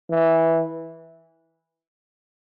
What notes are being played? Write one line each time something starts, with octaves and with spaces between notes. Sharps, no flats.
E3